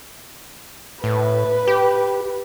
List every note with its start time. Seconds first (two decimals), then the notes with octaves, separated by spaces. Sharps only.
1.04 A2 B4
1.67 G4